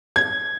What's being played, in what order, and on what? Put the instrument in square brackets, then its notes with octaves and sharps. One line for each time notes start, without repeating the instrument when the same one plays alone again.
[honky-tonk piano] G#6